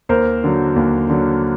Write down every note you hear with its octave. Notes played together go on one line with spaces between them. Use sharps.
D#2 A#4 C5
D3 F#3
D#2
D3 F#3